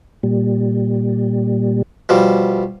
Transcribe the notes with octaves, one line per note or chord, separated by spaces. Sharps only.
A#2 G3
B2 F3 G3